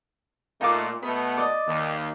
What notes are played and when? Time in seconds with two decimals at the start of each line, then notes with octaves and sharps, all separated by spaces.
0.61 A#2 A3 D#4 F4 D6
1.03 B2 A3 B3 B5
1.37 D5 D#5
1.67 D#2